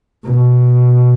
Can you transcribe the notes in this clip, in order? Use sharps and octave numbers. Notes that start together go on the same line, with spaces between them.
B2